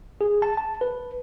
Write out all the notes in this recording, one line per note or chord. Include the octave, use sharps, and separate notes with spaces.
G#4
A5
A5
B4